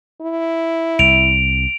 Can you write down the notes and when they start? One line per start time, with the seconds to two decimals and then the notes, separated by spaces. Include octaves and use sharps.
0.22 E4
0.99 C2 D7 F7